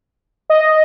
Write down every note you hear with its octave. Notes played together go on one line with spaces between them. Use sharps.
D#5